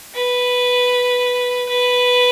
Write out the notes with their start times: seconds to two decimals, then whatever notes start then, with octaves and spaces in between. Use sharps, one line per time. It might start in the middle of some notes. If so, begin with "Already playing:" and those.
0.14 B4
1.69 B4